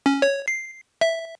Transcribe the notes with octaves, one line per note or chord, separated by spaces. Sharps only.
C#4
C#5
C7
E5